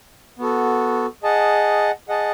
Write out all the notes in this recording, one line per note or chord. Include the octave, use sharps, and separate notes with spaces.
B3 F#4 A4
G#4 D#5 F#5 A5
G#4 D#5 F#5 A5